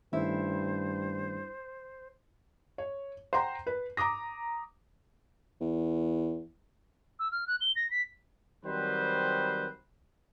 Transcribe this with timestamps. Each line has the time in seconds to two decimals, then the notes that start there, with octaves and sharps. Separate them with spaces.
0.13 G2 D#3 A3 C#4 E4 C5
2.78 C#5
3.33 C5 F#5 G5 A#5 C6
3.67 B4
3.97 A#5 D6 D#6 A#6
5.61 E2
7.19 E6
7.32 F6
7.47 F#6
7.61 G7
7.76 A#6
7.91 B6
8.65 D#3 F#3 G3 C4 B4 C5